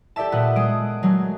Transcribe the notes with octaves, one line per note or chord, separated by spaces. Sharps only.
G4 A4 D5 E5 A5
A#2 B3 F#5
G#3 D#6 D7
F#3 G#3 A3